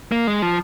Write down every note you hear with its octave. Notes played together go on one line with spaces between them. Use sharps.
A#3
G#3
F3